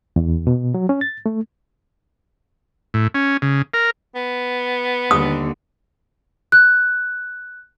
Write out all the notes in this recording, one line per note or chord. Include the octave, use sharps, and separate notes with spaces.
E2
B2
F#3
C#4
A6
A3
A2
C#4
C#3
A#4
B3
D#2 D3 D#6
F#6